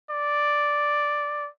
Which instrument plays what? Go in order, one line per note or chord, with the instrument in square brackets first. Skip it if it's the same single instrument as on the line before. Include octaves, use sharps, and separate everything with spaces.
[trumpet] D5